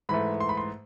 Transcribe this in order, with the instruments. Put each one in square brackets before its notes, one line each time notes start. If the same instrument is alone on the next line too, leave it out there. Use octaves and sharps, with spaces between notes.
[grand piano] G#2 E3 A3 B5
C6
B5
C6